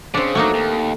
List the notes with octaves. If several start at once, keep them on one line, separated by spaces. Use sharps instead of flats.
C#3 C4 D4
F#3 A3 A#3 D#4
D#2